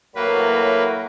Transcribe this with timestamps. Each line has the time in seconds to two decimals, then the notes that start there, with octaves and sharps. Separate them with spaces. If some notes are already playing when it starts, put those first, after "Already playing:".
0.15 A2 F#3 A#3 B4